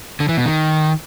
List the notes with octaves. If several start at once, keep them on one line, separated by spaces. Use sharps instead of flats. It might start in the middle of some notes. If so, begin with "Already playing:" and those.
D3
E3
B2
D#3